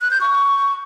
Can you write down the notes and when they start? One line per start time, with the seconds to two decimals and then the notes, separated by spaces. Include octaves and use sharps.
0.01 F#6
0.11 G6
0.21 C#6